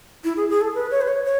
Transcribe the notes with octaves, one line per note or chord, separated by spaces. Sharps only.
E4
G#4
G#4
A4
B4
C#5
B4
C#5
C#5